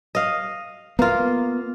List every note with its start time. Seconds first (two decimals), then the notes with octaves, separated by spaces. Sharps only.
0.15 D#5 F5
0.99 A#3 B3 F4